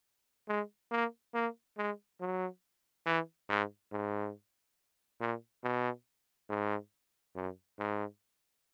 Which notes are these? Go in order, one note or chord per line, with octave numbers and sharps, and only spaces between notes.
G#3
A#3
A#3
G#3
F#3
E3
G#2
G#2
A#2
B2
G#2
F#2
G#2